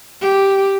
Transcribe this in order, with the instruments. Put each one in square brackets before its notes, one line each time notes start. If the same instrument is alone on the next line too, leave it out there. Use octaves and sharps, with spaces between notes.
[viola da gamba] G4